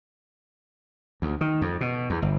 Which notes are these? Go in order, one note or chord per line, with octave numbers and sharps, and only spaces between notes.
D2
D#3
F2
B2
E2
G1